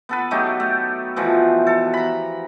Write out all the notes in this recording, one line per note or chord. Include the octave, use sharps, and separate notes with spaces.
B3 A4 B4
F#3 A3 D#4 G4
A3
B2 E3 F3 A3
A4
A#5 B5